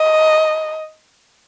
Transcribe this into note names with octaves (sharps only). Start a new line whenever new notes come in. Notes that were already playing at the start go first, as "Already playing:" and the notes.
Already playing: D#5